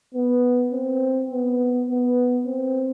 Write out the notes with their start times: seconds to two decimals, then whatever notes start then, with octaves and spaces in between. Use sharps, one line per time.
0.14 B3
0.72 C4
1.31 B3
1.88 B3
2.46 C4